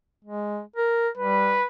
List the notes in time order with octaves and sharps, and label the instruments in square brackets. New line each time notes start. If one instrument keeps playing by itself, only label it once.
[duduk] G#3
A#4
[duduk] G3 [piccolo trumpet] B4